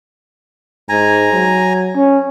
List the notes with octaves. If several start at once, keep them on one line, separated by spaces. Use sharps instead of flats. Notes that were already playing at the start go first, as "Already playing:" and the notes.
G#2 G#5 A#5
F#3
C#4